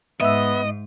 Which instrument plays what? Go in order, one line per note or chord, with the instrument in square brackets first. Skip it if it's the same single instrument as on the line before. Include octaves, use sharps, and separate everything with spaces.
[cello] G#2 [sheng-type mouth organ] B3 [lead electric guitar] D#5 [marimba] E5 E6